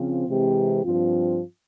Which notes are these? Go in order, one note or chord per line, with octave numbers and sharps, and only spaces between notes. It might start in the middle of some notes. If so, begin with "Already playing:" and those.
Already playing: C#3 F3 C4 F4
C3 E3 G#3 C4 G4
G2 F3 C4 F4